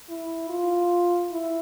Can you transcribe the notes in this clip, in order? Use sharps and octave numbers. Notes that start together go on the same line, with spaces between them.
E4
F4
E4